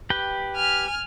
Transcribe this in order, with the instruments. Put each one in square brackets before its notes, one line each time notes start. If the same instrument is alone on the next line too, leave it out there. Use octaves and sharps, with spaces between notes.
[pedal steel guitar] G4 B4 G5
[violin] G#5 F6